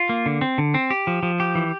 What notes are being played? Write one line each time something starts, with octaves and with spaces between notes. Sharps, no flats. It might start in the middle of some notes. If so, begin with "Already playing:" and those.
Already playing: F4
A#3
D3
C4
D3
C4
G4
F3
F3
G4
E3